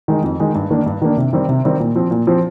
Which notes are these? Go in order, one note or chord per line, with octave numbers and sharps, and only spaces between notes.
D#3 G#3 D#4
F2
D#3 G#3 D#4
G2
D#3 A#3 D4
G2
D#3 A#3 D4
C3
D#3 G3 C4
C3
D#3 G3 C4
A#2
F3 C4
A#2
F3 C4